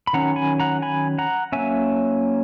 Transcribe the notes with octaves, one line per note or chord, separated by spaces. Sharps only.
B5
D#3 F#3 C#4 F#5 A#5
G#5 B5
F#5 A#5
G#5 B5
F#5 A#5
F#3 A#3 C#4 E5 G#5